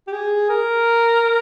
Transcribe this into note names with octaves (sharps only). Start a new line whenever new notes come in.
G4
G#4
A#4